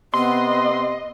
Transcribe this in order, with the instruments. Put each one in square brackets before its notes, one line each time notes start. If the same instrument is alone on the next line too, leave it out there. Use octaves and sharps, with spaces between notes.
[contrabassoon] C3 [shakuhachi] B3 [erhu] D#5 [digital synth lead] C6